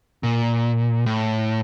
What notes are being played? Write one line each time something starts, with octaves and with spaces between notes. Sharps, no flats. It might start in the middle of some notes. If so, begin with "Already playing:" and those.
A#2
A2